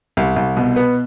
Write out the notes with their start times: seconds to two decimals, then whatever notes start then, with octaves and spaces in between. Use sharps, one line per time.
0.17 C2
0.36 C2
0.57 B2
0.76 B3